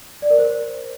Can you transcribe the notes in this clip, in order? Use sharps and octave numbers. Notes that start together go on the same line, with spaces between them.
D5
A#4
C5